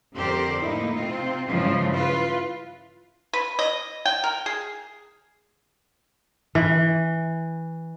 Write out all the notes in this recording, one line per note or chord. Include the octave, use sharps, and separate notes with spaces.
F2 D3 G4 A#4 C5 D5
A2 A3 A#3 D#4 E4
C3 C4 F4
G2 C#3 E3 F3 G#3
E4 F4 B4
B4
D#5
G5
A#4
G#4
E3